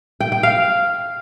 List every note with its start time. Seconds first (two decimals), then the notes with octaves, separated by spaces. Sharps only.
0.20 G5
0.32 G5
0.43 F5